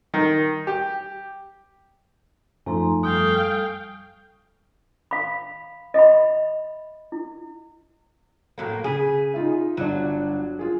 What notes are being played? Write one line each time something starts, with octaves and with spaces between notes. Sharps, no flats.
D#3
G4
F#2 F3 A3 D#4 G#5 A#5 C6
G3 A4 F5 G5 C#6 D#6
F5 B5
D#5 E5 F#5 B5
E4
A2 F#3 A#3
C#3 G#4 B6 D#7
D#4 F4 E5
G1 F#3 D4
F4 G#4